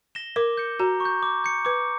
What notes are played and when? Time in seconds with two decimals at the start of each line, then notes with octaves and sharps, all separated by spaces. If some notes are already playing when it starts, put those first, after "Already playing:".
0.15 A#6 E7 G7
0.36 A#4 D6
0.57 G6 C#7
0.80 F#4 A#5
1.00 C#6
1.05 G6
1.23 D6
1.44 G6 C#7
1.65 B4 D6